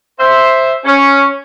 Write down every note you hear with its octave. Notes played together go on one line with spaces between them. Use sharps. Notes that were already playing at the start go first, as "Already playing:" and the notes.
C5 E5
C#4